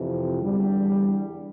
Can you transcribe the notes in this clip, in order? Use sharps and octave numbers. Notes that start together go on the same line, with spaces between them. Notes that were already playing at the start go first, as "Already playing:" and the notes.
Already playing: F2 C3 E3
E2 D3 G3